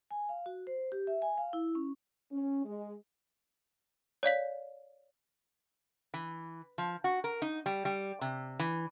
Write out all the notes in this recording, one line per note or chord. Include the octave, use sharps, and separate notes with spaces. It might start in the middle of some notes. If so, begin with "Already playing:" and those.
G#5
F5
F#4
C5
G4
E5
G#5
F5
E4
C#4
C#4
G#3
C#5 D5 F5 B6
E3
F3
F#4
A#4
D#4
G3
G3
C3
E3